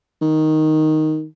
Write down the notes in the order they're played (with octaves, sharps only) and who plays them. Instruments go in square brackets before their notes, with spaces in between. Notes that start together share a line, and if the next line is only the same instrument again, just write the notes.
[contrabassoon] D#3